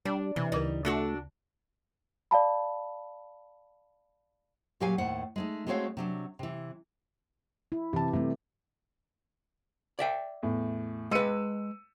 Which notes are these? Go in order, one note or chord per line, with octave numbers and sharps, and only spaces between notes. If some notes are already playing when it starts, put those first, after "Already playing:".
G3 D4
C3 E3
D2 C#3 G3 D#4 A#4
A3 D4 F#4 A4
D5 F5 A5 B5
A#2 F#3 G4 F5 G#5
D#2 A2 C5 F#5
G#3 A3 D#4
G#3 A3 C4 F#4 C#5 F5
C3 F#3 D4
C3 E3
E4
C3 E3 G4 A5
C3 G3 A3
D5 E5 G5
E2 A2
G#3 B4 E6 C#7 D#7